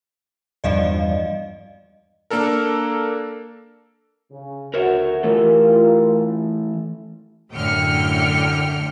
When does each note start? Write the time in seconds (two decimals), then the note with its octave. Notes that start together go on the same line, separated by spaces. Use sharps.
0.64 E2 G2 F3 D5 D#5 F5
2.30 A#3 D4 A4 A#4
4.31 C#3
4.74 D2 F#4 A#4 C#5 E5
5.23 E3 A3 F4 G4 A4 A#4
7.52 F#2 A2 D3 G5 F6 C#7